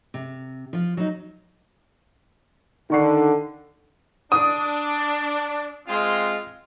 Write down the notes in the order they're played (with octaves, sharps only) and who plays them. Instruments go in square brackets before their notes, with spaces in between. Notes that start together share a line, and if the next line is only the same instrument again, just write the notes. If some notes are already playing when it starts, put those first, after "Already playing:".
[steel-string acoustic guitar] C3
F3 F4
F#3 D#4
[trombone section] D3 [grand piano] D#3 C#6 C7
[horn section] D4 [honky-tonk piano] D#6
[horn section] G#3 C4 F4